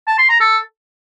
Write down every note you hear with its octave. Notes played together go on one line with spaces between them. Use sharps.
A5
C6
A#5
A4